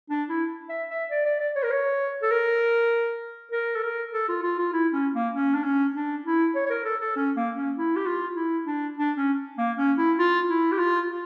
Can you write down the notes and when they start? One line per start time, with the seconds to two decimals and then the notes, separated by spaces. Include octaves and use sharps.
0.10 D4
0.29 E4
0.69 E5
0.90 E5
1.10 D5
1.25 D5
1.40 D5
1.56 C#5
1.63 A#4
1.71 C#5
2.22 A4
2.31 A#4
3.52 A#4
3.75 A4
3.82 A#4
4.13 A4
4.28 F4
4.43 F4
4.58 F4
4.73 E4
4.93 C#4
5.14 A#3
5.33 C#4
5.54 D4
5.64 C#4
5.94 D4
6.25 E4
6.55 C#5
6.66 C#5
6.70 A#4
6.85 A4
7.01 A4
7.16 C#4
7.36 A#3
7.56 C#4
7.77 E4
7.96 G4
8.06 F4
8.36 E4
8.67 D4
8.97 D4
9.17 C#4
9.58 A#3
9.78 C#4
9.98 E4
10.19 F4
10.49 E4
10.72 G4
10.79 F4
11.09 F4